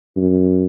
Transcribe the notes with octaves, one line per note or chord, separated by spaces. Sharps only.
F#2